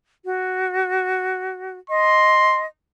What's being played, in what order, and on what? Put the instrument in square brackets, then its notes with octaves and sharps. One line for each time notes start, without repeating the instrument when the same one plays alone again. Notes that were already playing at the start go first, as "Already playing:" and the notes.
[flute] F#4
[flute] D#5 [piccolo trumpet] C6